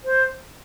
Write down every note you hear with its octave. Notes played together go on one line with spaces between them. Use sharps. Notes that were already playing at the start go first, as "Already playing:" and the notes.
C5